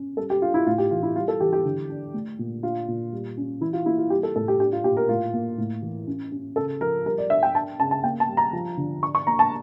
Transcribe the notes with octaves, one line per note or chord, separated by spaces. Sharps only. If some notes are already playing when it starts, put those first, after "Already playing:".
Already playing: C#4
G3 A4
G4
D4 F4
E4
A2 F4
G4
E3 F4
E4
G3 F4
A4
E3 G4
G4
D3
D4
A3
A#2
D4 F4
A#2
G3
C#4
E3 E4
F4
A#3 E4
F4
G3 G4
A4
A2 A4
G4
D4 G4
F4
A#2 G4
A#4
A2 F4
A#3
A2
E3
C#4
C#4
C#3 A4
F3 A#4
G3 A#4
D5
D4 E5
G5
D4 A5
C#3 A5
A5
A#3 G5
A5
G3
A#5
F3
D3
D4 C#6
C#6
A#3 A#5
A5